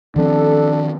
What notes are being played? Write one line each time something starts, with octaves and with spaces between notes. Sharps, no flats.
D#3 F3 C4 D4 A4